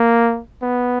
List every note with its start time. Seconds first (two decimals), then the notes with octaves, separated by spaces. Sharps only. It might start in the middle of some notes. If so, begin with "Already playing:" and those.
Already playing: A#3
0.63 B3